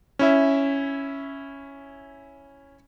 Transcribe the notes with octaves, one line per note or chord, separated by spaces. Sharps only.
C#4 E4 E5